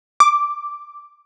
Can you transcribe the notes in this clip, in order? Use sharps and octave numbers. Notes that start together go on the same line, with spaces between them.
D6